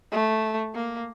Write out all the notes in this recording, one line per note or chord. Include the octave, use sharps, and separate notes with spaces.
A3
A#3